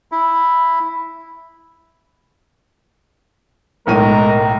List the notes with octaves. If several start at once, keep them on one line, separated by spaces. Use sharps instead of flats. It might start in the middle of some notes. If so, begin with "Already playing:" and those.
E4
B1 A2 G#3 A#4 D#7